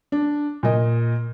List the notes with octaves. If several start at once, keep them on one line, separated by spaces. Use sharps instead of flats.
D4
A#2 D#5